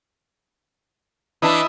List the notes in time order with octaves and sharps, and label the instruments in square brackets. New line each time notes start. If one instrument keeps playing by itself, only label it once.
[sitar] E3 D4 [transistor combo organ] E4 D#5 B5